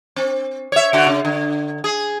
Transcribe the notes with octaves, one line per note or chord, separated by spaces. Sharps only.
C4
C#5 E5
D3 F#4
C#3
D3
G#4